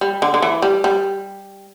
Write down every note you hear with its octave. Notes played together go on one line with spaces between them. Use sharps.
G3
D3
D3
E3
G3
G3